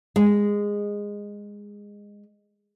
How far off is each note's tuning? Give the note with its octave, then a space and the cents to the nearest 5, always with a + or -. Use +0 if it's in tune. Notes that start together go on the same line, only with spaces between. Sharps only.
G#3 -15